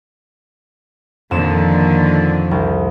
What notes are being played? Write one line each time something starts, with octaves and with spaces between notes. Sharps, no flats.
F2 A#2 D3 D#3 E7
C2